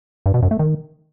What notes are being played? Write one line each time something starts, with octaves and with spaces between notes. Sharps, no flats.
G2
B2
F#2
A3
D#3